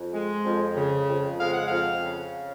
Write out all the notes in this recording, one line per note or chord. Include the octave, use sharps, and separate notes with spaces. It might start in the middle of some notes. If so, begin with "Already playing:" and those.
Already playing: F2
G#3
F2
C#3
F2
G#3 F5
F#5
F2 F5
C#3